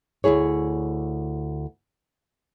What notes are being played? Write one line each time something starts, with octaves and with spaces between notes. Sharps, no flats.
D2 G#2 E4 G#4 C#5